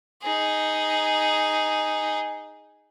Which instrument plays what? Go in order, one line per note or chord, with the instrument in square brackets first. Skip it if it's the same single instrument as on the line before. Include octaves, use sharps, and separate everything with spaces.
[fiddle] D#4 G#4